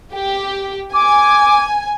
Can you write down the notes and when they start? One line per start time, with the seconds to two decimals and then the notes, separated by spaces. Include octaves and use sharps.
0.14 G4
0.94 G#5 D6